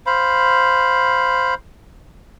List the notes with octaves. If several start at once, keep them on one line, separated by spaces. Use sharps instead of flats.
C5 F5 B5